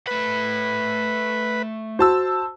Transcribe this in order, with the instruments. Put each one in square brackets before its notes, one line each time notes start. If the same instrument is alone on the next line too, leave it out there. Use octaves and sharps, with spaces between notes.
[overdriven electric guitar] A3 B5 [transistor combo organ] B4
[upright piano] F#4 [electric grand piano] C5 A5 E6